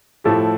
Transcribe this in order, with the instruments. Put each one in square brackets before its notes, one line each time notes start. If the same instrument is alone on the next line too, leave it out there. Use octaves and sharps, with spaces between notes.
[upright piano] A2 F3 A3 E4 G4